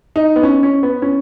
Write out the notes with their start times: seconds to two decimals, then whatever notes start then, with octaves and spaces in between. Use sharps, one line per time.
0.16 D#4
0.36 B3
0.43 C#4
0.63 C#4
0.83 B3
1.02 C#4